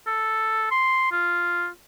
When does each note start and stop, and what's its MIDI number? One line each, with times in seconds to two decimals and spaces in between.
0.07 0.66 69
0.71 1.11 84
1.12 1.68 65